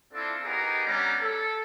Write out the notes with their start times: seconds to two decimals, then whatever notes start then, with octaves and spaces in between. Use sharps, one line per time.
0.14 C4 D4 E4 F4 A4
0.43 B3 D#4 G4 G#4 A#4
0.86 G3 B3 C#4 D4 A#5
1.21 A4